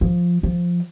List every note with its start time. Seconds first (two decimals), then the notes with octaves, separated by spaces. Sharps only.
0.01 F3
0.43 F3